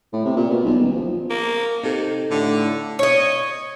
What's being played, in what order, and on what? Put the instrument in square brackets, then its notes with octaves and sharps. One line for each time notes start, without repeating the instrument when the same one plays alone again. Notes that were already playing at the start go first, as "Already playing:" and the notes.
[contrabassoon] A2
C3
A#2
B2
B1
D#1
F3
[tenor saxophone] A#3
[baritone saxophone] C3 [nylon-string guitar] D#4 A4
[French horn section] A2 [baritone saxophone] D3
[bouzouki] C#5 D#5